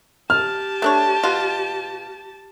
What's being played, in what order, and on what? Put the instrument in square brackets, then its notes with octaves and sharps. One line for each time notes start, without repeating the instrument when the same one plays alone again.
[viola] G4 A5 [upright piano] F6
[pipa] A3 D4 C#5
B2 F4